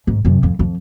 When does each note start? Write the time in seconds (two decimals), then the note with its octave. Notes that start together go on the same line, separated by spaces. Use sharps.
0.07 G#2
0.25 F#2 C3
0.43 F2
0.59 F2